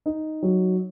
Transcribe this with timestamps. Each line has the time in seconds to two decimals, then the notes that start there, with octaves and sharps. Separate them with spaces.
0.06 D#4
0.43 F#3